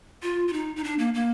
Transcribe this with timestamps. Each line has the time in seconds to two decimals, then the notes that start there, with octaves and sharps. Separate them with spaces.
0.23 F4
0.48 F4
0.53 D#4
0.76 D#4
0.84 D4
0.99 A#3
1.14 A#3